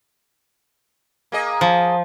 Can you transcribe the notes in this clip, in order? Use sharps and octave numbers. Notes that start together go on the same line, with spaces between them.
A#3 G#4 D#5
F3